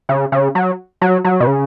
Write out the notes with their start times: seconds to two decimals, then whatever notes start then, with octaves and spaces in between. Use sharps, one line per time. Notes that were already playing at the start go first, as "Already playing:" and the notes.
0.09 C#3
0.32 C#3
0.55 F#3
1.01 F#3
1.24 F#3
1.40 B2
1.47 C#3